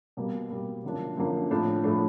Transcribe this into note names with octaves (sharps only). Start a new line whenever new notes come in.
B2 G3 A#3
B2 G3 A#3
F#2 D3 F3 A#3 D4
F#2 D3 F3 A#3 D4
A2 F3 A3 D4
A2 F3 A3 D4